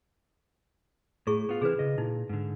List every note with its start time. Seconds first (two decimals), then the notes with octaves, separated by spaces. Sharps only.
1.27 A2 E4 G#4 C#6
1.49 B3 F4
1.61 C3 E3 E4 G#4 B4
1.79 C#3 D#5
1.98 A#2 D#4 E4
2.29 G#2 D3